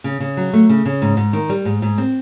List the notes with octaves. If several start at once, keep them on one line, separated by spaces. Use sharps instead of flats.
C#3
C#3
F#3
A3
C#3
C#3
G#2
G#2
D#3
G3
G#2
G#2
C4